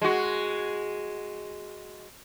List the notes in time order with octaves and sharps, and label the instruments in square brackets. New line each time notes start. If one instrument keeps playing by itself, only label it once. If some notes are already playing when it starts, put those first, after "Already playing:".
[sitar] G#3 F#4